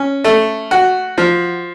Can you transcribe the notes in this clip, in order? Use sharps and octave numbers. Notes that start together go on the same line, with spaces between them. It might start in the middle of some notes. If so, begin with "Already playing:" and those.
Already playing: C#4
A3
F#4
F3